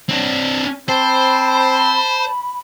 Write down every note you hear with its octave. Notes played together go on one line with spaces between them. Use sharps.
C4 D4
C4 C5 A5 B5